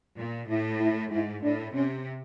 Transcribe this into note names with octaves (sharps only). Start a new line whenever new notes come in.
A#2
A2 E4
E4
G#2 E4
A2 D4
C3 C#4